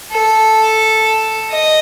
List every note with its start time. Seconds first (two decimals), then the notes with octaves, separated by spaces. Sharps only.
0.13 A4
1.50 D#5